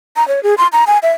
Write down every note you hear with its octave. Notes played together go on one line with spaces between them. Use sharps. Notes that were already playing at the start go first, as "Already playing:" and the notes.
A#5
C#5
G#4
C6
A#5
G#5
E5